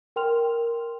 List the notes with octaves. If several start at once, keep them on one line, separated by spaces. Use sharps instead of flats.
A#4 G5 C6 F6 F7